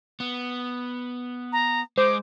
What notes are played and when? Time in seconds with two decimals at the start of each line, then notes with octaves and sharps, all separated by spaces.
0.20 B3
1.52 A#5
1.98 G#3 C5 D6